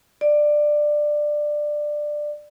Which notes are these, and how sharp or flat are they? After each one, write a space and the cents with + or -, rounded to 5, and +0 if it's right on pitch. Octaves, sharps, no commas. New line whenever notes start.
D5 +15